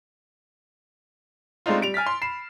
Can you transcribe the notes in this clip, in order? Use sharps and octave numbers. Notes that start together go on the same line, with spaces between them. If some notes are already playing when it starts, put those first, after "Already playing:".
G#3 A3 C4 D4 D#4 F4
G3 D7 F7
G#5 F6 A6 B6
C6
B5 C7 E7